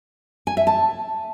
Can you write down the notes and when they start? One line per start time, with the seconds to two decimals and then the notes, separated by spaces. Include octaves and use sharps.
0.47 G#5
0.57 E5
0.67 A5